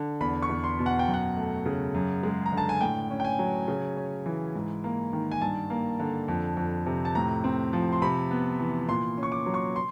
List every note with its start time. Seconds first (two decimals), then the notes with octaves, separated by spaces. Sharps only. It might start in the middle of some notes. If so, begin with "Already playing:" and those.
Already playing: D3
0.20 E2 B5
0.42 C#6
0.49 E2
0.64 C6
0.79 B2
0.86 F#5
0.99 G5
1.08 F#2
1.14 F#5
1.37 A3
1.66 C#3
1.94 F#2
2.23 G#3
2.46 A#5
2.52 D3
2.57 A5
2.69 G#5
2.81 A2 G5
3.10 C#4
3.20 G5
3.25 G#5
3.39 F#3
3.68 C#3
3.97 C#4
4.26 E3
4.55 G#2
4.84 A#3
5.13 D#3
5.31 G#5
5.41 G2 A5
5.70 A#3
6.00 D3
6.28 F2
6.57 F2
6.86 C3
7.05 A5
7.15 A2 A#5
7.44 C4
7.73 F3
7.93 C6
8.02 C3 B5
8.31 B3
8.60 E3
8.88 A#2 C6
9.17 C#4
9.23 C#6
9.32 D6
9.46 F#3
9.54 C#6
9.76 C6